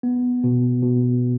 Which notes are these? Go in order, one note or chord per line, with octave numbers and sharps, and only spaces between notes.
B3
B2
B2